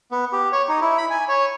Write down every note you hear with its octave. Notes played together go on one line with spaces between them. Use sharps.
B3
G4
C#5
D#4
E4
B5
G#5
C#5